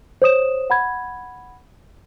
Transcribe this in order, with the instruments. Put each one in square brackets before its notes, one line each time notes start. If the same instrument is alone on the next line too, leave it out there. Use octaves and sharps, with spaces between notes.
[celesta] C5 C#5 D#6 E7
F#5 B5 G#6